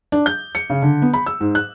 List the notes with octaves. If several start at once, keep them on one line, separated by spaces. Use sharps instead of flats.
D4
G6
C#7
C#3
D3
B3
B5
E6
G#2
F#6